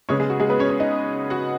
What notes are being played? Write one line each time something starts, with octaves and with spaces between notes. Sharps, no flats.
C#3 G#3 B3 C#4 C#5
G#3 G#4
F#4
G#3 G#4
B3 B4
C#4 C#5
C#4 C#5
D#4 D#5
F#4 F#5